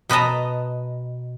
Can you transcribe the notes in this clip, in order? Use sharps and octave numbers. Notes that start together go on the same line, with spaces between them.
B2 B4 D#5 A5 A#5